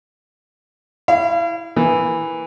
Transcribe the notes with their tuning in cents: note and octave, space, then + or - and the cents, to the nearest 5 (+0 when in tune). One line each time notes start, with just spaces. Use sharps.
E4 +0 F5 -40
E3 +0 A#3 +0